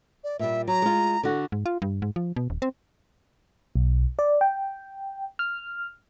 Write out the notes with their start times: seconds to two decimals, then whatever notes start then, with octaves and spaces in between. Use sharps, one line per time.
0.24 D5
0.39 A#2 G3 E5
0.68 F#3 A#5
0.82 G#3 F4
1.23 D3 F#4
1.52 G#2
1.66 F4
1.82 G2
2.02 G#2
2.16 F3
2.36 B2
2.50 D#1
2.62 C4
3.75 B1
4.19 D5
4.41 G5
5.39 F6